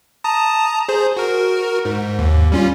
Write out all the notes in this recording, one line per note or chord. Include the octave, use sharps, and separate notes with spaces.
A5 A#5 D#6
G#4 C5
F#4 A#4
G#2
D#2
G3 C#4 F4